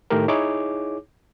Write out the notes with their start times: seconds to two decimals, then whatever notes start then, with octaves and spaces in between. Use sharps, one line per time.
0.10 A2 D#3 A3 D#4 G4 A#4
0.28 D#4 E4 G#4 C#5 D6